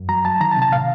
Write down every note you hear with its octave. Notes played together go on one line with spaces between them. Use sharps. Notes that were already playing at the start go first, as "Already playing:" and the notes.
Already playing: F#2
F#3 A#5
F#3 A5
D#3 A#5
A5
C3
A5
A2 F5